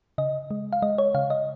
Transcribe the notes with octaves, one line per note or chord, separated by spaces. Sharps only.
C#3 D#5
G#3
F5
G#3 D#5
C#5
C#3 F5
D#5